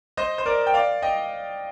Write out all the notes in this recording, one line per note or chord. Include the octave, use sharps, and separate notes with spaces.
C5 D#5
C5
A#4 D5
G5
D5 F5
D#5 G5